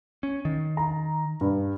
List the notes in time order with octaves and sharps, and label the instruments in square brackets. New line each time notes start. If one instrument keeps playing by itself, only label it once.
[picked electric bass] C#4
D#3
[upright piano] A#5
G2